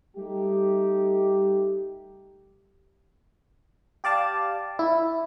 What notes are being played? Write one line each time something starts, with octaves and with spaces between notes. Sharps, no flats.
G3 A3 D#4 G4
G4 D5 F5 A5
E4